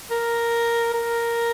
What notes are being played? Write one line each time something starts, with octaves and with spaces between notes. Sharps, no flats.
A#4
A#4